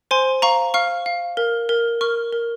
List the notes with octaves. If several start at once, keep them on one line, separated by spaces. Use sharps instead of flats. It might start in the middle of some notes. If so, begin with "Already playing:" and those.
C5 G#5 C6
F5 A#5 C#6
F5 C#6 F6
F5
A#4
A#4
A#4 C#6 F6
A#4